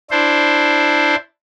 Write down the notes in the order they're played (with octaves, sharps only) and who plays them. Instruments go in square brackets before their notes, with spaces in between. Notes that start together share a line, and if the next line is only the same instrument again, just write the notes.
[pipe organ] D4 E4 C5